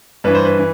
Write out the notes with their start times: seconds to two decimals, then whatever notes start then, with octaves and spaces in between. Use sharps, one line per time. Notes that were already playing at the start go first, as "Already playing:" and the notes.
0.24 G2 E3 B4
0.35 C5
0.45 B4
0.58 E3